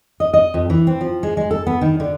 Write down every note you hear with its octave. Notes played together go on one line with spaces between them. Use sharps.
D#5
D#5
F2
E3
C4
F3
G#3
G#3
A4
B3
D#3
D3